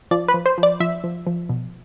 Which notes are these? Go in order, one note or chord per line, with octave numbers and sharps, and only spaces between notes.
F3 D5
B4
F3
C5
F3
D5
F3 E5
F3
F3
B2